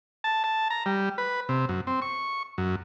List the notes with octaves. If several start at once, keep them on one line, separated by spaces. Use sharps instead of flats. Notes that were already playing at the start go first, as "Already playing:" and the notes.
A5
A5
A#5
G3
B4
C3
F#2
C4
C#6
F#2